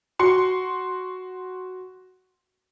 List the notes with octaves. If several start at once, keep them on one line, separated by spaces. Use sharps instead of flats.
F#4 C6 C#7